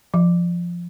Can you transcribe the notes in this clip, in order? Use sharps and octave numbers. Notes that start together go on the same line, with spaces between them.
F3